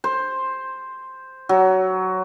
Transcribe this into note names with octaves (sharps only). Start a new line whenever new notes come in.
C5
F#3